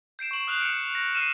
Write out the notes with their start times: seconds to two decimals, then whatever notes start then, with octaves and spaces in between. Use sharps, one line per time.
0.19 G6 C7 D7 E7
0.31 C#6 D7 F#7
0.47 D#6 F6 F#6 C7 F7
0.61 C#7 D7
0.95 A#6
1.15 F6 C7 D#7 E7